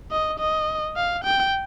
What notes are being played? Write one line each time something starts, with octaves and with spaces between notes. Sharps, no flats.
D#5
D#5
F5
G5